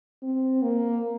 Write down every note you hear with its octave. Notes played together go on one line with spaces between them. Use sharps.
C4
A#3